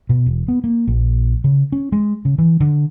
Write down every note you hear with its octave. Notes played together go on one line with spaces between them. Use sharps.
B2
E1
B3
A#3
A#1
C#3
C#4
G#3
C#3
E3
D3